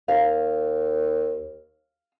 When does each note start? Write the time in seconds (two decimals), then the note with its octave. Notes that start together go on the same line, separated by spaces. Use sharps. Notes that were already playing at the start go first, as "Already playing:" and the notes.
0.08 D#2 F5